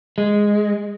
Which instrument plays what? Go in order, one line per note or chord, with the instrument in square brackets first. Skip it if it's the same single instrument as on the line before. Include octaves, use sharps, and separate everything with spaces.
[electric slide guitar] G#3